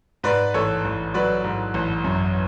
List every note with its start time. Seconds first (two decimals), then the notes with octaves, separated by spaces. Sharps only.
0.24 G#2 B4 D5
0.54 A1 A4 C#5
0.85 A1
1.14 F#3 B4 D5
1.44 G#2
1.74 A1
2.04 F#2